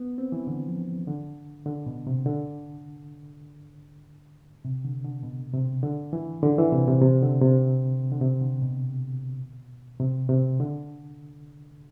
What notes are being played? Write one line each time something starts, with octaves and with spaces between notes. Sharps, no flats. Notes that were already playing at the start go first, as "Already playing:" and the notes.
Already playing: B3
C4
E3
D3
F3
D3
D3
B2
C3
D3
C3
D3
D3
B2
C3
D3
E3
D3
E3
C3
C3
C3
D3
C3
D3
C3
D3
B2
C3
C3
D3